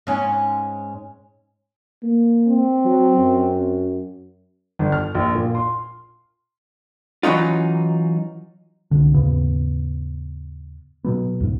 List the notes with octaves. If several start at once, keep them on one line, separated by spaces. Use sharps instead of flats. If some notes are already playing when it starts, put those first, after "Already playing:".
G#2 C#4
A#3
C4
F#3
F#2
G1
F6
A#1
A#2
C6
E3 F#3 C#4 D#4 F4
C2 D3
D#2 G#2 C#3 B3
B2 F#3 B3
C#2 G#2